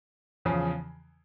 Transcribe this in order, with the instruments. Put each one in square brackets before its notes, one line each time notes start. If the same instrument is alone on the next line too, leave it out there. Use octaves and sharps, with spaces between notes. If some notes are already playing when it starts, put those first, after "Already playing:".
[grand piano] E2 C#3 F3